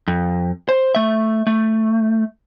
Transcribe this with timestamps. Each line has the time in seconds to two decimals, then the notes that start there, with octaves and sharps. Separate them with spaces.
0.08 F2
0.69 C5
0.95 A3 E5
1.47 A3